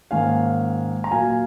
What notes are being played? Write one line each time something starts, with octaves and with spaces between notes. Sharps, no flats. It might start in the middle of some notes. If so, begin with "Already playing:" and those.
G#2 D#3 A#3 C#4 F5 G#5
A#5
A#2 F#3 A#3 F5 G#5